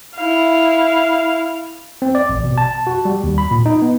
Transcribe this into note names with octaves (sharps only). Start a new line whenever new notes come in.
E4 F5
C4
D5
A1
B2
A5
F#4
G3
D#2
B5
A#2
D#4
B3